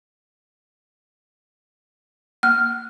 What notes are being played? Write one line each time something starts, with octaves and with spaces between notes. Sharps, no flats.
A#3 F6